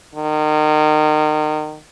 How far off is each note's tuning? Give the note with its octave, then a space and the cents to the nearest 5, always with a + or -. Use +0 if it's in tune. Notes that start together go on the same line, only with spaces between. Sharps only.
D#3 -30